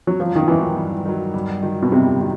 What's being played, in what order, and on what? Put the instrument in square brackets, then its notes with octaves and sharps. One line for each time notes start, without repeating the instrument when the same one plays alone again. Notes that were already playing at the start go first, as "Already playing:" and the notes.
[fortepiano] F#3
[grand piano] G2 [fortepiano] F3
[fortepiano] D#3
[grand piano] D#3 F#3 [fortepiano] E3
[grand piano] G2
D#3 F#3
G2
D#3 F#3
[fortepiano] B2
[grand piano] G2 [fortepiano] C3
[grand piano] D#3 F#3